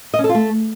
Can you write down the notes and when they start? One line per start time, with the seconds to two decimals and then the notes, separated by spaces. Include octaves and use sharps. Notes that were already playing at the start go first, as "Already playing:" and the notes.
0.14 D#5
0.19 C#4
0.24 A4
0.29 F4
0.34 A3